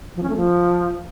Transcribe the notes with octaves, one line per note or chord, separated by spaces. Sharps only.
F3
C#4
A3
F3